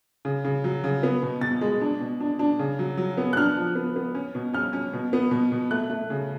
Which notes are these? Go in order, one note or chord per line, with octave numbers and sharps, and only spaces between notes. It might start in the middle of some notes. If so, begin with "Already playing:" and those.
C#3
C#3
F#3
C#3
B3
B2
B2 A6
G#3
D4
B2
D4
D4
C#3
F#3
F#3
B3
F#6
D4 F6
F3
B3
B3
C#4
B2
C#4 F6
C#4
B2
B3
B2
B2
A3 F#6
A3
C#3